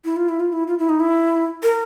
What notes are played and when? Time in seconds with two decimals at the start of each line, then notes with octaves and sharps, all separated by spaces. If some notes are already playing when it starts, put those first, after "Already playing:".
0.05 E4
0.16 F4
0.29 E4
0.40 F4
0.53 E4
0.68 F4
0.79 E4
0.89 D#4
1.00 E4
1.63 A#4